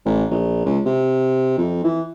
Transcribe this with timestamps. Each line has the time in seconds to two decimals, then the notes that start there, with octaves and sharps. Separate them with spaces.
0.05 A1
0.31 A#1
0.65 C#2
0.86 C3
1.58 F2
1.84 E3